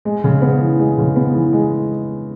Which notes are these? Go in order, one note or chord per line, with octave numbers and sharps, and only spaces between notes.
G#3
C#3
B3
E3
G#3
C#3
B3
E3
G#3